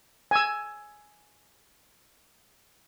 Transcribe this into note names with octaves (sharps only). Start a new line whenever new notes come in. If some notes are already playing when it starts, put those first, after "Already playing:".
G#5 E6